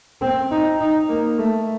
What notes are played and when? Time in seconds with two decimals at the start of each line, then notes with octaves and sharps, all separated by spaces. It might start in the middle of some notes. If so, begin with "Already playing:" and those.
0.21 C4
0.51 D#4
0.80 D#4
1.09 A#3
1.38 A3